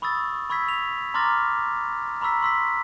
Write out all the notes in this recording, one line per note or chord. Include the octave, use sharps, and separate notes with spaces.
B5 C#6 D#6 E6 A6
B5 C#6 E6 G#6 B6
F7
A#5 C6 D6 F6 A6 A#6
A#5 B5 C#6 E6 B6
C6 E6 B6